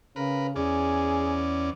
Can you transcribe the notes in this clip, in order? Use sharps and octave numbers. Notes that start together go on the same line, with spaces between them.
C#3 A#4 B4
E2 C#4 G#4 D5